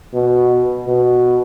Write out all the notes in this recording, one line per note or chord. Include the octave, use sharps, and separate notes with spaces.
B2
B2